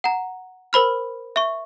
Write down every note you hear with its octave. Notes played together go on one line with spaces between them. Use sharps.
F#5 A#5
A#4 C5 B5 F6
E5 C#6